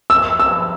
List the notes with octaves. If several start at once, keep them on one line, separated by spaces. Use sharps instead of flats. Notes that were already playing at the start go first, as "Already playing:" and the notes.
E6
E6